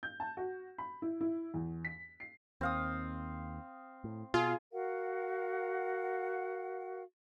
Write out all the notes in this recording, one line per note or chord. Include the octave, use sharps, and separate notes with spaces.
G6
A5
F#4
B5
E4
E4
E2
B6
C7
D#2 C4 F5 D#6
A2
B2 F4 G#4
F#4 A#4 F5 F#5